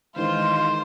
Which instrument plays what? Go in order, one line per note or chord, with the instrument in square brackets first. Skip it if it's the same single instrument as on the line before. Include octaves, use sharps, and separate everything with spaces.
[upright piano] D#3 E3 [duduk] G#3 [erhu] F4 [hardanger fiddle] C5